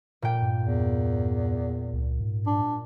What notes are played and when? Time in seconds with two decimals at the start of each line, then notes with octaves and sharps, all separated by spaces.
0.22 A#2 G5
0.42 G2
0.62 E2
1.94 C#2
2.21 G#2
2.47 D4